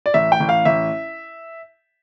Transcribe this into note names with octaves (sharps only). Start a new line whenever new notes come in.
D5
A1 E5
G5
A1
F5
A1 E5